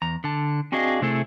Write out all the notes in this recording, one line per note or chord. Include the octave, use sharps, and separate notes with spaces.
E2 A#5
D3 A5
C4 D4 F#4 G#4 D#5 F5
C3 A3 C4 E4 G#4 A4